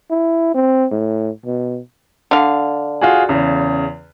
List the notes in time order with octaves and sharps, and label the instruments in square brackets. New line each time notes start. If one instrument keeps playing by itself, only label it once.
[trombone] E4
C4
A2
B2
[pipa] D3 F5
[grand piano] F4 F#4 G#4
E2 C#3